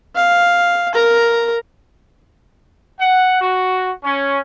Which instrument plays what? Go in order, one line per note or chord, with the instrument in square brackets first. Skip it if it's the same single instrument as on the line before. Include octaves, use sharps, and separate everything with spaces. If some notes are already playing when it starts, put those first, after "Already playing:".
[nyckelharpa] F5
A#4 A#5
[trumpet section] F#5
F#4
C#4